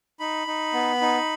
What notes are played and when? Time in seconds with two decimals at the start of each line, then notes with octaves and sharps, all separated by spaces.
0.19 D#4 B5
0.47 D#4
0.73 B3
1.01 D#4